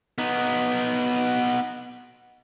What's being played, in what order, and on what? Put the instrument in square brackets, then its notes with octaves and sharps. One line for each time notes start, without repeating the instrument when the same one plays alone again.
[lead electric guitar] B3 D#4